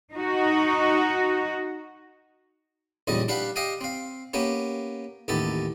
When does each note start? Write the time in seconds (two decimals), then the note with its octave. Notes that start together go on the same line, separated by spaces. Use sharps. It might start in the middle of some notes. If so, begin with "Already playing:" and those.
0.13 D#4 F#4
3.07 A#1 E2 C#3 G3 D#5
3.28 D4 G4 B4 F5 F#5
3.56 G4 D#5 F5 G5 G#5
3.81 C4 F5
4.34 A#3 B3 C#4 G4
5.28 A1 D#2 B3 G4 A4